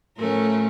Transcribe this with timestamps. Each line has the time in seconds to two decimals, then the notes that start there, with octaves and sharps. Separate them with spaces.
0.16 A2 F3 A3 C#4 A#4